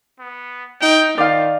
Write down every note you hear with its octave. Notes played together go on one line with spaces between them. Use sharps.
B3
D#4 G5
D#3 F4 D5 F5